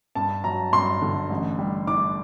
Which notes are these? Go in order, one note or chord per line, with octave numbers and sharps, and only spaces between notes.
G2 A5
F#3 A#5
G2 C6
D3
A1
G3
D4 D6